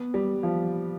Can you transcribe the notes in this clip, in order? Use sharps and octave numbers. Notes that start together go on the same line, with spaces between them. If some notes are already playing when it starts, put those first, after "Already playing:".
Already playing: B3
G3
F3